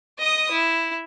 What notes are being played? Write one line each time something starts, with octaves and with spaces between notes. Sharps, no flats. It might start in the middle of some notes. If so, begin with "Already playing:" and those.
D#5 D#6
E4